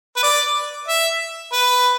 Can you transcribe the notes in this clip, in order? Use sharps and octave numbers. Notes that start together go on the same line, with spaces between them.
B4
D5
E5
B4